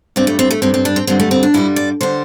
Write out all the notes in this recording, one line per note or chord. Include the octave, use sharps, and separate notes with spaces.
G2 G3 C4
A3
C4
A3
G2 G3 C4
C4
D4
C4
G2 D3 G3 C4
A3
C4
D4
G2 D3 G3 E4
D5
D3 G3 C5